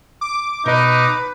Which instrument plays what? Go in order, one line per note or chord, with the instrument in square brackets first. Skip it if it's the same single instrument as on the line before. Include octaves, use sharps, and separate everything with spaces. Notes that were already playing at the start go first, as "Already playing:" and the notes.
[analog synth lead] D6
[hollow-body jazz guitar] B2 D#5 [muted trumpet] D#4 [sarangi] B4